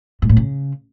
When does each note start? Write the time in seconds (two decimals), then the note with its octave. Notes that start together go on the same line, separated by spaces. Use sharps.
0.22 G#2
0.29 A2
0.37 C#3